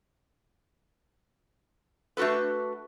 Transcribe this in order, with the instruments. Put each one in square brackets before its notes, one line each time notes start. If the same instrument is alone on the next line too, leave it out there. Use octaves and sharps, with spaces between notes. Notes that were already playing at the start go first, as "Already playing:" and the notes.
[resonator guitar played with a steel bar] A3 D4 F#4 A4 B4